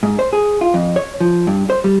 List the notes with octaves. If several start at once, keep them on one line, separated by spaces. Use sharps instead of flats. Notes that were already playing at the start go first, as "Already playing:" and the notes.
G#2
C5
G#4
F4
F2
C#5
F3
G2
C5
G3